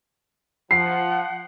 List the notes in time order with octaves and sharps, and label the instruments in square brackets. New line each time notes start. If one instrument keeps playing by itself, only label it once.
[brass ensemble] F3 [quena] F#5 [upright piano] C7